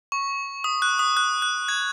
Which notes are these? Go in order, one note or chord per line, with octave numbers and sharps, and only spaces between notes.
C#6
D#6
F#6
D#6
F#6
F#6
G#6